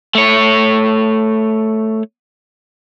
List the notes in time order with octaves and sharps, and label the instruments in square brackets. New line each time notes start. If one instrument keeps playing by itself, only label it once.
[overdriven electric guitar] A3 C#5